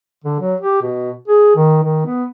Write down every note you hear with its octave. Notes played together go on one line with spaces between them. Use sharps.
D3
F#3
G4
B2
G#4
D#3
D#3
B3